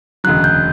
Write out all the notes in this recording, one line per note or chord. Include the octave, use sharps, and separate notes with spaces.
E1 D2 C#3 F#3 F#6
G6